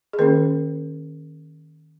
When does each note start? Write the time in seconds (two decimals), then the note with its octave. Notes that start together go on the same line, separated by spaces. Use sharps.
0.13 G#4
0.19 D#3 A#3 C#4 A#4